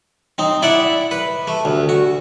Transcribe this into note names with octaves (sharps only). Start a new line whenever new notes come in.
C4 D#4
E4 D5 E5 F#5
B4
A3
D2
F#4